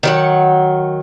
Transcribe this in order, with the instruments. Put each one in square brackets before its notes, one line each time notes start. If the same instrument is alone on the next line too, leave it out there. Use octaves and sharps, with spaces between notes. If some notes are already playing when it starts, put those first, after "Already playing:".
[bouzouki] D#3 F#3 F#5